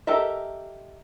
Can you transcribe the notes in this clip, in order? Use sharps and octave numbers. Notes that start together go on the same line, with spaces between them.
G4 A4 A#4 D#5 E5